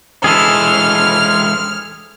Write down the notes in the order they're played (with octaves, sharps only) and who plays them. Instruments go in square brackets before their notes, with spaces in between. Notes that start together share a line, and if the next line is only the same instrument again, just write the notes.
[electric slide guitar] E3 G#3 [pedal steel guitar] G#4 A4 [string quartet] F6